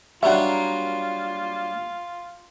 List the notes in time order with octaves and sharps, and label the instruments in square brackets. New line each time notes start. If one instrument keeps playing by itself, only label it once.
[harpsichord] F#3 G3 D4 [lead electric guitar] A#3 A#5 [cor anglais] F4 [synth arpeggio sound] E5 F#5